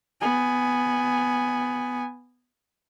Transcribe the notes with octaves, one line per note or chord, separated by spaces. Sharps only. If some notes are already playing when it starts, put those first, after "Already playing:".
B3 G#5